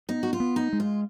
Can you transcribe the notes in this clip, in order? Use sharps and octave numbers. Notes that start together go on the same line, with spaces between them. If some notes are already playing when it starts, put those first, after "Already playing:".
B3 D#4
F#4
F4
B3
D#4
G#3
F4